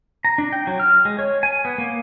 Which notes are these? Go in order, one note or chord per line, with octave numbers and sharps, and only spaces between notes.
A#5
D4
G5
F#3
F6
G#3
C#5
G#5
B3
A#3